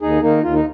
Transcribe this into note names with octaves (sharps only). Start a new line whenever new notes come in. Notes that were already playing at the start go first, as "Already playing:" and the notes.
D#2 D#4 G#4
D#3 A#3 D#4
D#2 F4
D#4